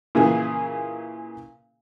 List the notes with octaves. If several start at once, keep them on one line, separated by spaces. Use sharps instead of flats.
A#2 C#3 E3 G#4